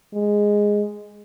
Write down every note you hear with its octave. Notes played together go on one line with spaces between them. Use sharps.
G#3